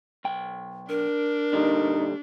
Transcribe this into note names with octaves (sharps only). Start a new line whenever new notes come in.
B1 G5
D4 A#4
A#2 D3 G3 D#4